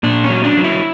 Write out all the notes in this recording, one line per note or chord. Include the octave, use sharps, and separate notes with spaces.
A#2 D4
C#4
F#3
D4
F#3
E4